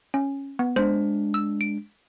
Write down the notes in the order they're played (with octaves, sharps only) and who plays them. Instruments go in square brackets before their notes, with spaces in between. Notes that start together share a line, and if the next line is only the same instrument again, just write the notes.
[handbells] C#4
B3
[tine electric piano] G#3 D4 [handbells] C5
[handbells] E6
D7